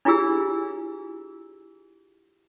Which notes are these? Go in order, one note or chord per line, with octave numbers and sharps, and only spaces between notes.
D4 E4 F4 G4 G#4 E6